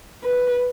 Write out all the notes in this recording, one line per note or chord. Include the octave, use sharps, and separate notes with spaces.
B4